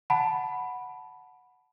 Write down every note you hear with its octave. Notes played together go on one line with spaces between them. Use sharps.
F#5 A5 B5